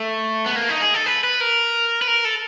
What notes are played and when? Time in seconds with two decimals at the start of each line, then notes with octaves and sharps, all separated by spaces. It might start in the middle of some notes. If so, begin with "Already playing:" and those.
Already playing: A3
0.46 B3
0.56 A#3
0.69 D#4
0.81 G#4
0.94 A4
1.06 B4
1.24 B4
1.41 A#4
2.02 B4
2.07 A#4
2.25 A4